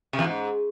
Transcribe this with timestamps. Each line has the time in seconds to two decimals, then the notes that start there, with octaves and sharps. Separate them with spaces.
0.13 C3
0.19 E2
0.24 G#2